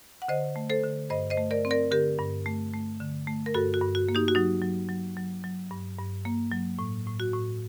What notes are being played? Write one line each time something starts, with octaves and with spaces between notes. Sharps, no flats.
F#5
D3 C5 D#5
A3
A4 C5
D3
G2 C5 D#5
C5 D#5
A3
A#4 D5
C4
A#4 D5
D3 G4 A#4
G2
A3
A3
D3
A3
A#4
G2 F#4 A4
F#4
G2
F#4
A#3
D#4 G4
F#4
F#3 D#4
F#3
F#3
F#3
F#3
G2
G2
A#3
F#3
A2
A2
F#4
A2